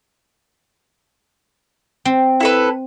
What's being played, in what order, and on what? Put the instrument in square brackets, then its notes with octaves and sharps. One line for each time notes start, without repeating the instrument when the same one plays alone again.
[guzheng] C4
[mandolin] E4 A4 B4